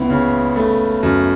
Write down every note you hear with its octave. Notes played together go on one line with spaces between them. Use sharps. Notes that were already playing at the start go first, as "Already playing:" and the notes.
Already playing: C#2 B3 E4
C#3
A3
F#2